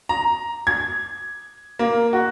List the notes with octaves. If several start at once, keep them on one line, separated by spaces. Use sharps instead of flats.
A#5
G#6
A#3
F#4